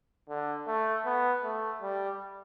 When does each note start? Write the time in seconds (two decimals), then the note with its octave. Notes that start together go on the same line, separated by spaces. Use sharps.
0.29 D3
0.67 A3
1.05 B3
1.44 A3
1.82 G3